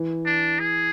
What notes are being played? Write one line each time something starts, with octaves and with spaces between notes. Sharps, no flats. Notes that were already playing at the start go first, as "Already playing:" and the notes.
Already playing: E3
D4
G#4